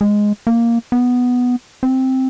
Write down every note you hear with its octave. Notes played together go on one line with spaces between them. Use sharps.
G#3
A#3
B3
C4